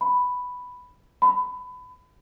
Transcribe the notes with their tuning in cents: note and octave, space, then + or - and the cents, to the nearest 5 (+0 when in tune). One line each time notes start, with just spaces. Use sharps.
B5 +5
B5 +25